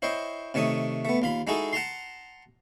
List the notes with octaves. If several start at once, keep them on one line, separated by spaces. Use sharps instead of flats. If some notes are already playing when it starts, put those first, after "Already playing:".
E4 C5 C#5 D#5 G5
C3 D#3 A3 C#5 D#6
A3 B3
D#2 F4 B5
G#3 D#4 E4 F#4 G#4 A4
F#5 A5 A#5 C6